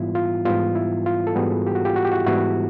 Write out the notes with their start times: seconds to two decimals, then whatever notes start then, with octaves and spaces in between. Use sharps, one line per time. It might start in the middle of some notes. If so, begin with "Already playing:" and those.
Already playing: G#2 E3 G3 B3 E4 F4
0.15 F4
0.45 G#2 E3 G3 B3 F4
0.75 E4
1.06 F4
1.27 A4
1.35 G#2 E3 G3 B3 F#4 G#4
1.67 G4
1.75 F#4
1.85 F4 G4
1.96 F#4
2.05 G4
2.12 E4 F#4
2.26 G#2 E3 G3 B3 E4 F#4